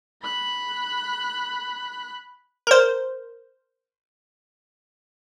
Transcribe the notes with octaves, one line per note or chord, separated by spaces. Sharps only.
B5 F#6
A#4 C5